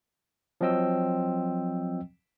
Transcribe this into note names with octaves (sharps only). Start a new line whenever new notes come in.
F3 F#3 C4 D#5 G5 E6